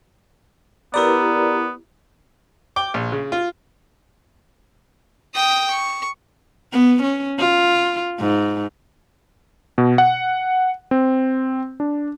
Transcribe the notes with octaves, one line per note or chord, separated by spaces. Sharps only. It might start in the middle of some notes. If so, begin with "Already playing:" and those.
B3 E4 G4 A#4 B4 D5 A#5
G5 D6
A#1
C#3
F4
G5 D#6
C#6
B3
C#4
F4
G#2
B2
F#5
C4
D4